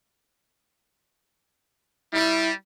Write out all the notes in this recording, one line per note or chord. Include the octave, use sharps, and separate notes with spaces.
G3 E4